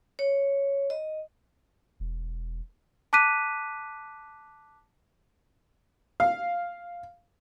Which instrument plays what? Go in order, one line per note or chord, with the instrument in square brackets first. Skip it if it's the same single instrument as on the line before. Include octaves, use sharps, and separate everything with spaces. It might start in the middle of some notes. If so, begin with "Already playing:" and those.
[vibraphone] C#5
D#5
[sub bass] E1
[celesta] A5 D6 F#6 B6 D#7
[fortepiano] F5